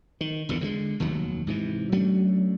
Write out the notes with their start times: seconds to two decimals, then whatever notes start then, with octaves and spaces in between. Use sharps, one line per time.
0.21 D#3
0.49 G1 E2 A#2 D3
0.61 D3 D#3 G#3
1.00 F1 D#2 D#3 F#3
1.47 G#2 C3 E3
1.92 F#3 A3 C#4 D4